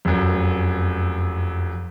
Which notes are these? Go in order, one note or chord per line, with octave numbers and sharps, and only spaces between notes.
F1 F#2